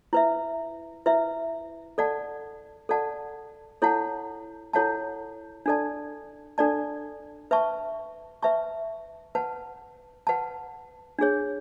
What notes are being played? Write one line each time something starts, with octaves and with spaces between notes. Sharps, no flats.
E4 B4 E5
E4 B4 E5
A4 D5 F#5 A5
A4 D5 F#5 A5
E4 A4 C#5 F#5 A5
E4 A4 C#5 F#5 A5
D4 A4 D5 A5
D4 A4 D5 A5
B4 E5 A5 C#6
B4 E5 A5 C#6
B4 F#5 A5
B4 F#5 A5
D4 G#4 C#5